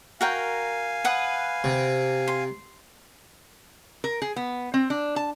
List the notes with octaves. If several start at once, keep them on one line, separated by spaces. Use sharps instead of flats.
F#4 A#4 F5 G5 G#5
B4 F#5 D#6
C3
C6
A#4
G#4
B3
C4
D4
A5